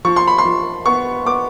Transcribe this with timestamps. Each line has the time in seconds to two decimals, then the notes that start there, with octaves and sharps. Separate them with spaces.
0.05 F3 C#6
0.16 C6
0.27 B5
0.38 C6
0.45 F3
0.86 B3 C#6
1.26 B3 D6